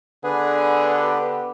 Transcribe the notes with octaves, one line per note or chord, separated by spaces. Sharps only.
D3 B3 D4 G#4 B4
G4